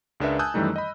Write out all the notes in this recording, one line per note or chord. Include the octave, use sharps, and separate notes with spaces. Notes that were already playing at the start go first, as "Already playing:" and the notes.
C#2 G#3 D4 A#4 B4 E5
G#5 A5 D#6 E6 F#6 G6
F#2 D#3 E3 G3 A3 D#4
D#5 B5